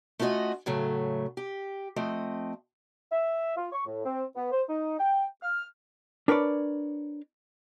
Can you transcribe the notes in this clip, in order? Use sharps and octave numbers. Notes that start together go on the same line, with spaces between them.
A3 C#4 F4 F#4 D#5
A2 C#3 F#3 A3
G4
F3 A3 C4 D#5
E5
F4
C#6
A2
C4
B3
C5
D#4
G5
F6
D4 A#4 B4 C#5 D5